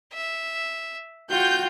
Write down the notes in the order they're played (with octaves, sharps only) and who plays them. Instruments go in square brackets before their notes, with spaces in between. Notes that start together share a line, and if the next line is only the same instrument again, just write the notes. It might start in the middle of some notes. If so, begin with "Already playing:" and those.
[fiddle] E5
[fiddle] F4 [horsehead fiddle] F#4 G5 [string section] G6